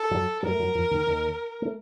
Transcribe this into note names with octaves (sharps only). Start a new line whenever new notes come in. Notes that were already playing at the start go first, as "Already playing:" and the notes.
Already playing: A4
F#2 F#3
F#2 F#3 A#4
A3
F#2 F#3
F2 F3
D#2 D#3
D#2 D#3
A3